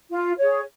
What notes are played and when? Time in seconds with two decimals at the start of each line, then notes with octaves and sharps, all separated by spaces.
0.11 F4
0.37 G#4 C#5